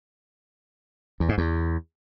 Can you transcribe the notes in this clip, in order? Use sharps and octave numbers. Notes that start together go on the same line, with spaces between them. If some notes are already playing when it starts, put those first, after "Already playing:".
E2
G#2
E2